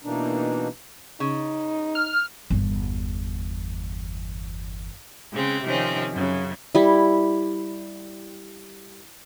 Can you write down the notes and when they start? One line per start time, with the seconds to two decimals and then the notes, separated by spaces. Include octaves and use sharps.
0.04 B2 E3 A#3 D4 D#4
1.20 C#3 D#4
1.95 F6
2.50 G1 E2
5.33 C#3 G#3 C4
5.64 C3 D#3 F3 C4 C#4
6.12 F#2 C#3
6.75 G3 E4